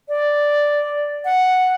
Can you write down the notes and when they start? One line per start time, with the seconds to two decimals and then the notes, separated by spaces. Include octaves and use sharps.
0.09 D5
1.25 F#5